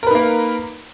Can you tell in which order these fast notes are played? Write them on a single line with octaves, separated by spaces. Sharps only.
A#4 B4 D#4 A#3